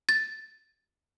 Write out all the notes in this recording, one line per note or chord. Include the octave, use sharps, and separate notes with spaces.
A6